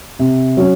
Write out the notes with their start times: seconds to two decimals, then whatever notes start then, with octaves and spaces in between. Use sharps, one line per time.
0.19 C3
0.57 F#3 C#4